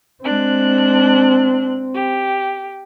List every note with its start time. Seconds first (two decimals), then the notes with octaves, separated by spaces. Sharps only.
0.24 G#3 C4 D4 F#6
1.94 G4